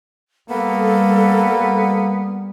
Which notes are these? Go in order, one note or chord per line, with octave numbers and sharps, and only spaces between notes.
G3 A#3 B3 A4